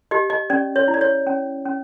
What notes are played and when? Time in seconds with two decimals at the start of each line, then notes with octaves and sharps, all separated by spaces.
0.11 G4 D#5
0.30 D#5
0.50 C#4 D5
0.76 C#5
0.88 E4
0.94 D5
1.01 C#5
1.27 C#4
1.65 C#4